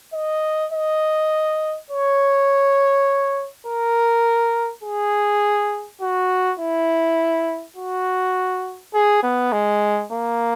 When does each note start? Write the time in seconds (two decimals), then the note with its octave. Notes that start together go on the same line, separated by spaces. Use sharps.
0.14 D#5
0.72 D#5
1.90 C#5
3.67 A#4
4.83 G#4
6.01 F#4
6.59 E4
7.76 F#4
8.94 G#4
9.23 B3
9.52 G#3
10.12 A#3